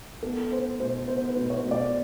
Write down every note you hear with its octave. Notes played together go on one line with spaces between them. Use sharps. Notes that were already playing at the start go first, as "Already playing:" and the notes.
B3 A4
B3 C5
B2 C5
B3 C5
B4
B2
C#5
B2
D5